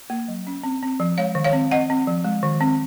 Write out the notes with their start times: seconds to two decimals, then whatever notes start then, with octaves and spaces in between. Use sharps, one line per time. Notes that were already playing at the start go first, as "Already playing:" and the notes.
0.10 A#3
0.28 F#3
0.47 C#4
0.63 C4
0.83 C4
1.00 F3
1.18 G#3 C#5 F5
1.35 D#3
1.44 C#5 F5
1.53 C4
1.71 C4 D#5 F#5
1.90 C4
2.07 F3
2.24 G#3
2.43 D#3
2.61 C4